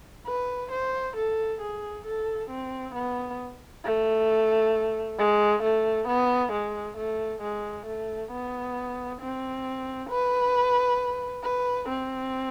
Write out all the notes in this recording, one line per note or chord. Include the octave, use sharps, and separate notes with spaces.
B4
C5
A4
G#4
A4
C4
B3
A3
G#3
A3
B3
G#3
A3
G#3
A3
B3
C4
B4
B4
C4